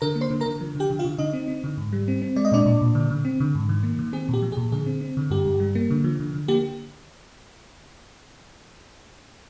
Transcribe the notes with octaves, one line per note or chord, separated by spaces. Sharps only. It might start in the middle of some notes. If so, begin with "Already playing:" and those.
D3 A#4 A#5
A#3
C5 C6
D3
A#4 A#5
D3
F3
D3
G4 G5
D3
F4 F5
D3
D3 D#4 D#5
C4
C4
D3
G#2
G3
C4
C4
G#3 D5
D#5
A#2 D4 D5
A#2
A#2
D3
D3
C4
D3
G#2
D#3
A#3
D#3
C4 G#4
A#2 G4
F3
G#4
A#2
D3 G#4
C4
C4
D3
G2 G4
G2
G3
A#3
D3
F3
D3
D3
A#3 G4